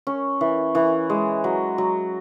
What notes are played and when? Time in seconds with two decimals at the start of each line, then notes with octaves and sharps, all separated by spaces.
0.07 C#4
0.41 E3
0.75 E3
1.10 G#3
1.44 F#3
1.78 F#3